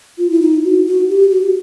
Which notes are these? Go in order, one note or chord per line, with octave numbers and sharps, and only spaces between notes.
F4
E4
D#4
F#4
F#4
G4
F#4